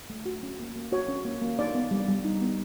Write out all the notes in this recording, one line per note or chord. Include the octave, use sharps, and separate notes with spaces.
A3
F#4
C#4
A#3
A#3
F#4 C#5
C#4
A#3
A#3
D#4 D5
B3
G3
G3
D#4
B3